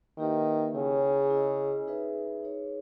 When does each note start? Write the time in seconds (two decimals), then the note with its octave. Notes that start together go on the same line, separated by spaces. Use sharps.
0.18 D#3 A#3 E4 G4 B4 E5
0.74 C#3 E4 G#4 C#5
1.30 E4 G#4 D#5
1.87 D#4 G#4 B4 E5
2.43 D#4 G#4 C#5